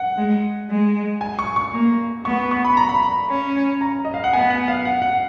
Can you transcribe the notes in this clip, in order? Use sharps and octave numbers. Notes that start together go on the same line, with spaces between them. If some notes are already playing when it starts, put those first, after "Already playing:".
Already playing: F#5
G#3
G#3
G#5
C#6
C#6
A#3
B3 C#6
C#6
B5
A#5
B5
C#4
A#5
D#5
F5
F#5
B3 G#5
F#5
F5
F#5
F#5